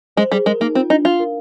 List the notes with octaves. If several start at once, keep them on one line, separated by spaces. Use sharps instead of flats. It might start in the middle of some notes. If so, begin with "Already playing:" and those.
G#3 C5
G3 G#4
G#3 A#4
A#3 D#4
C4 F4
D4 D#4
F4 F5
A#4